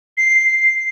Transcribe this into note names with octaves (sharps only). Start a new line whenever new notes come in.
C7